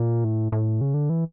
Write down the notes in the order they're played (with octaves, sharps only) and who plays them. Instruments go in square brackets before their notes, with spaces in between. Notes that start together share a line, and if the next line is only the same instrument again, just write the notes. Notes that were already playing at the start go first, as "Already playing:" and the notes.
Already playing: [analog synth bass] A#2
A2
A2
C#3
D3
E3